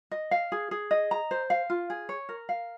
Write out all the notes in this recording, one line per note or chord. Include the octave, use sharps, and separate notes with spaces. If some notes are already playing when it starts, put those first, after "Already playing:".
D#5
F5
G#4
G#4
D#5
A#5
C5
F5
F4
G#4
C#5
A#4
F5